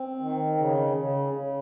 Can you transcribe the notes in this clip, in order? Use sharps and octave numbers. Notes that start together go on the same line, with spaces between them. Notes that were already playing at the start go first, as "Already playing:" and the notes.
Already playing: C4
D#3
C#3
C#3
C#3